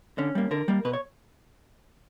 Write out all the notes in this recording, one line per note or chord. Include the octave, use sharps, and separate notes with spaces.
D3 C#4
G3 A#3
D3 A#4
G3 A#3
B2 B4
C#5